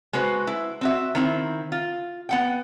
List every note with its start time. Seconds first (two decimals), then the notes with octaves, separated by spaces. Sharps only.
0.13 G#3 F#4 B4 C5
0.47 E4
0.81 C4 F#4 E5
1.15 D#3 C4 E4
1.72 F4
2.29 B3 F#5 G5